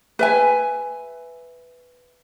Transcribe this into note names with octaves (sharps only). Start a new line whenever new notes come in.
B4 E5 G#5